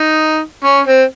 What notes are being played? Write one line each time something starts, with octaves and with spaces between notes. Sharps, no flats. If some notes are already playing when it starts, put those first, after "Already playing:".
Already playing: D#4
C#4
C4